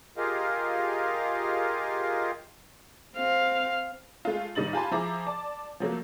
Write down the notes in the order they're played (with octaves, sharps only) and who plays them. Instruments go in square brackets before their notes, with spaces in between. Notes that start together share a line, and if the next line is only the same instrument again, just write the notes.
[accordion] F4 G4 G#4 A#4 D#5 F5
[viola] C4 F5
[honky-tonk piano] G#3 A3 F4
A1 D#3 G3 D#4 A6 F#7
F4 G4 G#5 A5 B5 C6
F3 E4 G#4 A#5 D6
D5 A5 D6
F3 F#3 A3 A#3